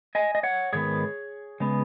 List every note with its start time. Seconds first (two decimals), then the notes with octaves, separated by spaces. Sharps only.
0.15 D#5 G#5
0.35 D#5
0.43 C#5 F#5
0.73 G#2 D#3 B3 G#4 C#5
1.60 C#3 G#3 B3